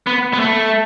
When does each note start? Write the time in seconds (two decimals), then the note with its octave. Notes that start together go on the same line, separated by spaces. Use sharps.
0.07 B3
0.33 B3
0.40 A3